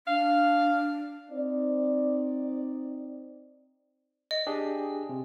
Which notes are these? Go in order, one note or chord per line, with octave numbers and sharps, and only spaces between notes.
D4 F5
C4 D#4 D5
D#5
D4 G4 G#4
C3